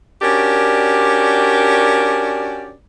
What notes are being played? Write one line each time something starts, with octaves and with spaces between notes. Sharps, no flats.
C#4 D4 F#4 G4 A#4 D5